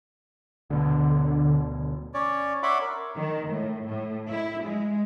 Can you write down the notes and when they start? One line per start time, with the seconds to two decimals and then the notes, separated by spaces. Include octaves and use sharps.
0.70 D2 B2 D3
2.14 C#4 C#5 D5
2.63 C#5 E5 F#5 B5 C6 D6
2.81 A#4
3.16 D#3
3.48 A2
3.87 A2
4.31 E4
4.63 G#3